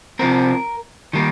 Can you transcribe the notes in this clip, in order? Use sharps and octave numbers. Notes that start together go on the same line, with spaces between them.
C3 F3 C4 A#4
D#3 G3 A#3